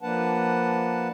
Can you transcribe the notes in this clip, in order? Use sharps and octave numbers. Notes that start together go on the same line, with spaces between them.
F3 A#3 D4 B4 F#5 A5